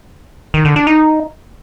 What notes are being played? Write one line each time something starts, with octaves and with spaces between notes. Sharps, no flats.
D#3
D3
D4
D#4